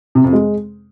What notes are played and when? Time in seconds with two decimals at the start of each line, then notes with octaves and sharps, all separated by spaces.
0.15 C3
0.24 F2
0.33 G#3